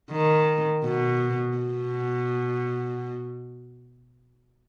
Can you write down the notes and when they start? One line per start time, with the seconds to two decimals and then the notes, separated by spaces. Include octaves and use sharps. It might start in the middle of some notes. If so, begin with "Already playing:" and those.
0.11 D#3
0.84 B2
1.57 B2